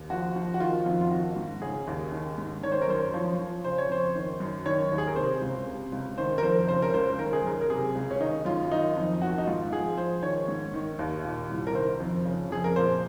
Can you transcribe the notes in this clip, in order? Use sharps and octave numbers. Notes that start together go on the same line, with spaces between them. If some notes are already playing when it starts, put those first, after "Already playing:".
Already playing: D#2
F3 F#4
F3
F#4
D#3 F4
F2
F4
D#3 F#4
G#2
C#3 G#4
D#2
D#3
G#2
D#3 C#5
C5
A#4
F#2 C5
F3 C#5
F3
C#3 C5
C#5
F2 C5
D#3
F#2
D#3 C#5
D#2
G#4
A#4
C3 C5
C#2
C3
C#2
D#3 C5
A#4
F2 C5
C#3 C5
A#4
C#2 C5
D#3 A#4
G#4
F#2 A#4
A#4
C3 G#4
C#2
C#4
D#3 D#4
F#2 F4
D#3 D#4
F2
D#3 F#4
D#4
G#2 F4
F3 G#4
F3 C5
D#3 C#5
G#2
D#3
D#2
A#2
C2
A#4
D#3 C5
F2
C#3
F2 G#4
A#4
A#2 C5